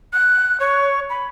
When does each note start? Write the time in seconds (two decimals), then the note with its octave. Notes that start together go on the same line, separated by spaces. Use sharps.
0.13 F#6
0.60 C#5
1.10 B5